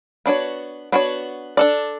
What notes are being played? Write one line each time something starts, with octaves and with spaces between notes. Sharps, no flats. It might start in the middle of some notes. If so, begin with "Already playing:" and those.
B3 D4 F#4 C#5
B3 D4 F#4 C#5
D4 A4 D5